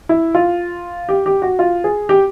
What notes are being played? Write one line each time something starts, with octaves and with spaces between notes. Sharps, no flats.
E4
F4
G4
G4
F#4
F4
G#4
G4